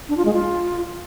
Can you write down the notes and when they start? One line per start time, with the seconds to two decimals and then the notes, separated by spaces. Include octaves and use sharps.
0.09 D4
0.17 F4
0.25 G#3
0.34 F4